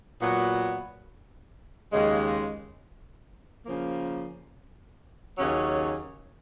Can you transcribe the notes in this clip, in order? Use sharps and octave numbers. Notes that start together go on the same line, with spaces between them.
A#2 F#3 B3 F#4
D#2 C#3 G#3
C#3 F3 A#3
D#2 C#3 F#3 C#4